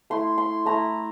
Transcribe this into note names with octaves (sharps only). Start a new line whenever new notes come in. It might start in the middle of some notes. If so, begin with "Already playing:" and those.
A3 E4 C6
C6
A3 E4 A#5